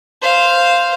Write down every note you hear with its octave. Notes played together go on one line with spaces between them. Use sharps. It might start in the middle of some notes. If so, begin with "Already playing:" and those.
C5 F5